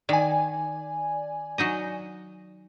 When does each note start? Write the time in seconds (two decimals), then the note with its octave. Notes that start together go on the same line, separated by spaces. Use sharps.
0.09 D#3 D5 G#5
1.58 F#3 D#4 D#5